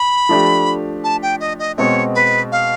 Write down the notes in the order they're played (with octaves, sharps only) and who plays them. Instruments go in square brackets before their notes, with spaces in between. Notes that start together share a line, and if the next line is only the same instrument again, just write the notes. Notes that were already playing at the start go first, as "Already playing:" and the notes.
Already playing: [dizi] B5
[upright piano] F3 A3 D4 G4
[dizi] A5
G5
D#5
D#5
[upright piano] B2 G#3 C4 [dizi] C#5
[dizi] B4
F5